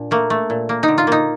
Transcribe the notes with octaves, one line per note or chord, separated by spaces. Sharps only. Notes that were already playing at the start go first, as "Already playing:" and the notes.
Already playing: A#2 D4
A3 A#3
A3
A#2
A#3
D#4
D3
F4
A#3 D#4